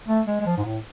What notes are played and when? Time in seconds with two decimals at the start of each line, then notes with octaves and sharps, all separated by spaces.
0.09 A3
0.28 G#3
0.41 G#3
0.46 F3
0.57 G#2
0.65 A2